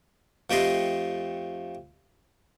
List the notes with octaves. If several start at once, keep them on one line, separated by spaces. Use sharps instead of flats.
F2 A3 G4 D#5 C6